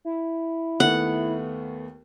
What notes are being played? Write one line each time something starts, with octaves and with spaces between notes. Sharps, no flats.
E4
D#2 A3 B3 F#5